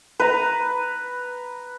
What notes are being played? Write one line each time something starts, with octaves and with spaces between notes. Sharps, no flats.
B4 A#5